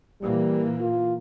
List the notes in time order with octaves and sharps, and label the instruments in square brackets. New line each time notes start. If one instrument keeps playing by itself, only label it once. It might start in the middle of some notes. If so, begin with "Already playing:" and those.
[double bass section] A#2 E3 A#3 [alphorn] G3
[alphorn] F4